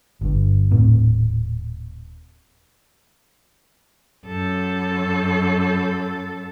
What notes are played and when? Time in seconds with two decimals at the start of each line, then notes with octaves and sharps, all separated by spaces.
0.21 G1 G2
0.71 D#1 A2 A3 C4
4.26 F#2 A4